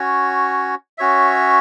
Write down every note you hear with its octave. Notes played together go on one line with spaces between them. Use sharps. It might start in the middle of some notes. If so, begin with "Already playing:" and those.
Already playing: C#4 F#4 C#5
C#4 F#4 C#5 E5